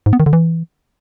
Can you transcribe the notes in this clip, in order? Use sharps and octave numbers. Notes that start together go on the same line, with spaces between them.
G#2
B3
D#3
D3
E3